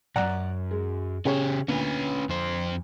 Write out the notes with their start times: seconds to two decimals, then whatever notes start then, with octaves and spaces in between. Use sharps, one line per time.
0.16 B1 F#2 D5 F#5 A#5
0.71 G#3
1.25 C#3 C#4 G4 G#4 C#5
1.68 D2 A#2 C#4 B4
2.29 F2 C5